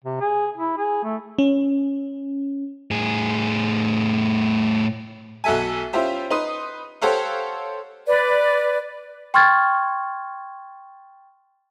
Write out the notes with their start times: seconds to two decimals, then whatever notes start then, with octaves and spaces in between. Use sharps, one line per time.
0.04 C3
0.21 G#4
0.57 E4
0.78 G#4
1.04 A3
1.39 C#4
2.91 A2 G#4
5.44 B1 F#4 A4 E5 G#5
5.93 C#4 E4 F4 G4 C5 E5
6.30 D#4 B4 C6 D#6
7.02 G4 A4 C5 C#5 F5 F#5
8.07 B4 D5
9.34 G5 C6 C#6 F6 G#6 A6